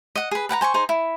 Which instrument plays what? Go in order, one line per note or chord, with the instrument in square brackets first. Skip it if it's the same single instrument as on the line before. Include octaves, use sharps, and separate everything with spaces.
[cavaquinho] D#5 F#5
G#4 B4
B4 F#5 G5 A#5
C5 G#5 A5 C#6
D#4 G#4 C5
E4